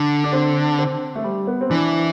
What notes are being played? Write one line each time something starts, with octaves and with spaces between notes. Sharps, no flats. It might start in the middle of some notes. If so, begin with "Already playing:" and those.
Already playing: D3
D4
C4
C4
A3
G3
B3
C4
E3 D4